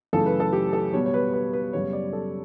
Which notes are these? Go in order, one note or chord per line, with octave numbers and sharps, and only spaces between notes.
F#2 C#3 E3 A3 A4
B4
A4
G4
A4
B2 G3 B3 C#5
C#5
B4
B4
B4
F#2 C#3 G3 B3 C#5
D5
A4